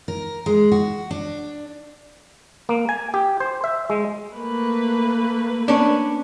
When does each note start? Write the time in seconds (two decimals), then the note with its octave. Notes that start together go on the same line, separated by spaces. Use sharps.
0.08 A#4
0.46 G#3
0.72 F#4
1.11 D4
2.69 A#3
2.89 G#5
3.14 G4
3.40 C5
3.64 E5
3.90 G#3
4.34 A3 A#3 B4
5.68 C#4 D4